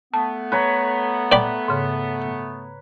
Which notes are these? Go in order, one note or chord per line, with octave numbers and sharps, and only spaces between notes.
A3 B3 A5
B4 C#5 A#5
D5 G5 B5
G#2 C#3